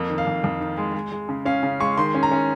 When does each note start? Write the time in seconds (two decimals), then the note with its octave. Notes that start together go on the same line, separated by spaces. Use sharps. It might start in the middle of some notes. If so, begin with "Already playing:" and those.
Already playing: F2 A#3
0.10 D#3
0.18 F5
0.27 F2
0.44 F2
0.60 D#3
0.77 G#3
0.94 G#3
1.12 G#3
1.29 C#3
1.45 C#4 F5
1.63 C#3
1.80 G#3 C#6
1.97 D#3 C6
2.14 C#4
2.23 A#5
2.31 C#4